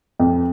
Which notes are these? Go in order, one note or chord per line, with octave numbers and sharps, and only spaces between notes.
F2